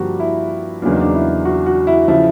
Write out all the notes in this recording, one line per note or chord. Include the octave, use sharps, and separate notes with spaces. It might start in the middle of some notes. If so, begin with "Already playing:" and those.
Already playing: G2 D3 F3 A#3 F#4 G4
E4
E2 C#3 F#3 A#3 D4
D#4
D4
E4
F#4
F#4
E4
C#3 F3 E4